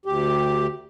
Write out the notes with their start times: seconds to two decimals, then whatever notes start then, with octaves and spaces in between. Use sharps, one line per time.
0.06 D2 G4